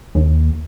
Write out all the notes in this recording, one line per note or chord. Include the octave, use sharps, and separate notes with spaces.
D#2